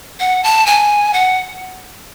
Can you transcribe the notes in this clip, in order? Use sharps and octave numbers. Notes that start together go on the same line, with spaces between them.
F#5
A5
G#5
F#5